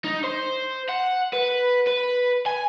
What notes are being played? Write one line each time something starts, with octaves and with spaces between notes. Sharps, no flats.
D#4
C5
F#5
B4
B4
G#5